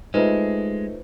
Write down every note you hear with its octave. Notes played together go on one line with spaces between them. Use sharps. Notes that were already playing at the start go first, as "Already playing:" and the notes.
G#3 A3 D#4 F4 B4 C5